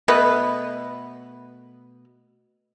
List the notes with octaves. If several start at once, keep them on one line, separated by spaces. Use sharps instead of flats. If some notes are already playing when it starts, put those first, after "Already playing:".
B2 A3 B3 B4